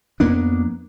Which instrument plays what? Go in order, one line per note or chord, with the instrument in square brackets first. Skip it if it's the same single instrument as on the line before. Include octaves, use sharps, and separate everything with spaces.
[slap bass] F2 A#3 B3 D4